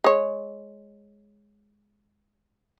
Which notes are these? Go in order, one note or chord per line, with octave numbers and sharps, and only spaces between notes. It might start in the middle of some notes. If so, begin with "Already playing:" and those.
G#3 C#5